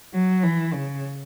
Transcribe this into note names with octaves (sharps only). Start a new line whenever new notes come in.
F#3
E3
C#3